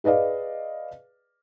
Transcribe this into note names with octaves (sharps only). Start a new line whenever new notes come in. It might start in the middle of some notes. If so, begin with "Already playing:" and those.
G#4 B4 D5 D#5 F5